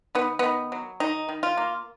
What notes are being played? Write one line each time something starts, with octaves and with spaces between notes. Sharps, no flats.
D#3 B3
D#3 B3
F#3
D#3 D#4
D#3
F4
A#3